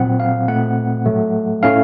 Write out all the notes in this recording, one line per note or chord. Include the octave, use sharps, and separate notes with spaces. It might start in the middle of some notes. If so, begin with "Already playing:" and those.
Already playing: A#2 F#3 C4 F#5
F5
A#2 A3 C4 F#5
A2 F#3 A3
A2 A3 C#4 F5